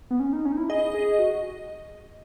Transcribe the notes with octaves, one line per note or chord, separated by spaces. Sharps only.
B3
C#4
D#4
C#4
D#4
E4
G#4 D#5
G#4
F#4